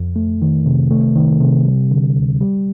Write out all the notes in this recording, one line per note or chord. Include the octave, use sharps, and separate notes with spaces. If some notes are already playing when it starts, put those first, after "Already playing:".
Already playing: F2
A3
D#3
C3
A3
D#3
C3
G3
D3
D2
G3